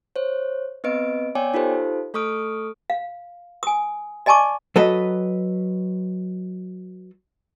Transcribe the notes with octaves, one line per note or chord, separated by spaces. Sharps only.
C5 C#5
B3 C4 B4 D#5 D7
B3 C#5 D5 G5 G#5 D6
D#4 F4 G4 A4 C5
A3 A4 C#6 D#6 F6 D7
F5
G#5 D#6
D5 D#5 G#5 A5 C#6 D6
F#3 A4 B4 D#5